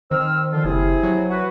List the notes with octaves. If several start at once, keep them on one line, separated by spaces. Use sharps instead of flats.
D#3 C4 E6 F6
D3 F3 F4
F#1 C3 E4 G#4
F#3
F#4 B4